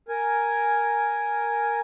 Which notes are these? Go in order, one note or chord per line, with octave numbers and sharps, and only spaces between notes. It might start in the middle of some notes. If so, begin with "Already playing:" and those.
A#4 G#5